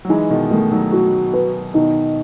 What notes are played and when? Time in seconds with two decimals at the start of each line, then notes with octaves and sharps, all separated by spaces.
0.05 F#3
0.09 E3 G#3 D#4
0.30 B2 D#3
0.51 B2 D#3 A3
0.71 D#3 F#3
0.92 F#4
1.33 B4
1.74 B2 D#3 D#4